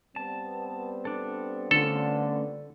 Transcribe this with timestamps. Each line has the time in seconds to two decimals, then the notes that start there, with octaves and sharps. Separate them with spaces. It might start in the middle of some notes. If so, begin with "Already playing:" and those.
0.16 G3 B3 C4 A5
1.05 D4 A4
1.71 D3 A3 C#4 F4 A4